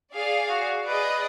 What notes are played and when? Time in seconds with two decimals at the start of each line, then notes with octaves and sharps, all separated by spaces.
0.12 G#4 D5 F5
0.49 F#4
0.88 G#4 B4 D5 D#5